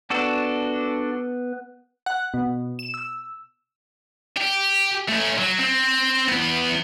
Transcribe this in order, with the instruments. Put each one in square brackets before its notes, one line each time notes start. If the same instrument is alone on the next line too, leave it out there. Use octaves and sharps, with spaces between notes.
[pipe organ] B3 B4 [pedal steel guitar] D4 F#4 A4
[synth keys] F#5
B2
E7
E6
[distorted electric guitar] G4
A3 C#4
F#3
C4
E2 B3